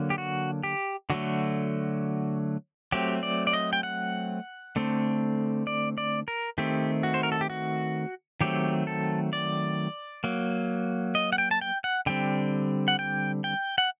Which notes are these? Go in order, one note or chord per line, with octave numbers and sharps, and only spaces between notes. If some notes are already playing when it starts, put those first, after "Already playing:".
Already playing: D3 F#3 A#3
G4
F#4
G4
D3 F#3 A3 F#4
F#3 A3 C4 G4
D5
D5
D#5
G5
F#5
D3 A3 C4
D5
D5
A#4
D#3 A3 C4 G4
F#4
C5
A#4
A4
G4
F#4
D#3 F#3 A3 C4 G4
A4
D5
F#3 A#3
D#5
F#5
G5
A5
G5
F#5
D3 G3 C4 G5
F#5
G5
G5
F#5